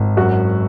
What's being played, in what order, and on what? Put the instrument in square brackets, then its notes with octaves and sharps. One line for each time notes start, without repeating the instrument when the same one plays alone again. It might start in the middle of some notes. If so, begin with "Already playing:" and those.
Already playing: [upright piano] G#1
F#2 F#4